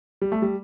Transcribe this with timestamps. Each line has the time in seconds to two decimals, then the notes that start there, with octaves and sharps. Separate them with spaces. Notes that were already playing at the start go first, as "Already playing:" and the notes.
0.22 G3
0.32 A3
0.42 G3